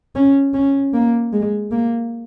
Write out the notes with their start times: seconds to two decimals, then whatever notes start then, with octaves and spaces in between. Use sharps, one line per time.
0.15 C#4
0.54 C#4
0.94 A#3
1.33 G#3
1.72 A#3